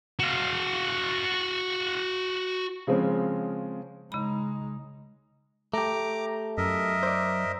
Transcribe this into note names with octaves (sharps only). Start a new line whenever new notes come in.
F#4 F5
C#3 F3 G#3 C4 C#4
C#3 G#3 D#4 B5
A3 G4 A#5 D6
F#2 A#4 D#5 E5
C5 D5